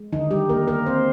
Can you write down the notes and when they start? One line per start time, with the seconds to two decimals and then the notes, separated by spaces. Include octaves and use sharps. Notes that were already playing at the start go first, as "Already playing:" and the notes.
Already playing: G#3
0.12 D3 D#3 D#4
0.31 G3 G4
0.49 A#3 A#4
0.68 A#3 A#4
0.86 A#3 C4 C5